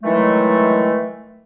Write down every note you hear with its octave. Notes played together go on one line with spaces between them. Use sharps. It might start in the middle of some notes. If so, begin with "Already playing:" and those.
D#3 E3 F#3 G#3 A3